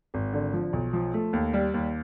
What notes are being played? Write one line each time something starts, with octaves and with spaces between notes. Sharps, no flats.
G#1
D3
F3
B1
F3
A3
D#2
G3
D#2